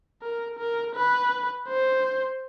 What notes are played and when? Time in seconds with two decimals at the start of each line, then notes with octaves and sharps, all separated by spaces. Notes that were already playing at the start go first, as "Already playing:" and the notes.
0.23 A#4
0.59 A#4
0.95 B4
1.69 C5